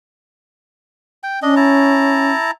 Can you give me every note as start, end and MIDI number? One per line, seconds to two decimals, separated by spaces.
1.23 1.40 79
1.42 2.32 61
1.42 1.55 62
1.42 1.55 75
1.56 2.51 64
1.56 2.51 81
1.56 2.51 82